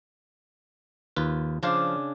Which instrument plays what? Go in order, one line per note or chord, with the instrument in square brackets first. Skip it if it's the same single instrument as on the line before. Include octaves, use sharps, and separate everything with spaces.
[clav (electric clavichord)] D#2 F4 B4
[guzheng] C#3 D4 [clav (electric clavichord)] F3 C5 F5